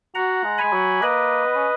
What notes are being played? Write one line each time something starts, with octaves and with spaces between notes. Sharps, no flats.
F#4 F#5 A#5
G#3
G#3 G#5 B5
F#3
A#3 B4 D#5
B3
C#4